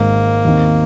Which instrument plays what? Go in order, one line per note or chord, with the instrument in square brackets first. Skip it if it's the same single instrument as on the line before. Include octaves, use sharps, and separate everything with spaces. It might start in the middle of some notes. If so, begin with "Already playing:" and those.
Already playing: [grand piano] G#1 G#2 G#3 [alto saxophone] A#3
[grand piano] D#2 D#3 C4